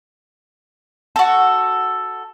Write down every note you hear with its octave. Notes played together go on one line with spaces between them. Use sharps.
F#4 A4